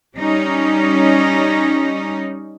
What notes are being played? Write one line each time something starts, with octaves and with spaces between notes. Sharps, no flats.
G3 C#4 D#4